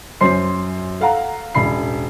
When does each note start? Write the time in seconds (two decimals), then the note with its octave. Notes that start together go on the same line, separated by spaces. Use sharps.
0.21 F#2 C#4 C5 C6 C7
1.00 A4 F5 F#5 A#5
1.55 E1 A1 B5 C7